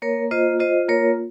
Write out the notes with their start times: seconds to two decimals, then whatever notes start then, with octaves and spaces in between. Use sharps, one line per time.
0.02 A#3 A#4 C#5
0.31 F4 C5 D#5
0.59 F4 C5 D#5
0.88 A#3 A#4 C#5